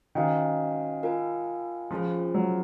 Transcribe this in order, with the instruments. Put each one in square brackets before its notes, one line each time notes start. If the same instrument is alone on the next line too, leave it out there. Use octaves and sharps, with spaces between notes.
[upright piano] D#3 [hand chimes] C#4 F#4 C5 F5 G#5
[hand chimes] F4 A#4 F5 G#5
[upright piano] F3 [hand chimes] C#4 F4 G#4 C5
[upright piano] F#3